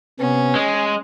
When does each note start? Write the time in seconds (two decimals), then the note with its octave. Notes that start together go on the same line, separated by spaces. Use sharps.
0.20 C3 B3 C#4
0.55 G#3 G#5